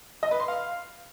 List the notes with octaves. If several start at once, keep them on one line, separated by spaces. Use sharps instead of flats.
D#5
B4
C6
F5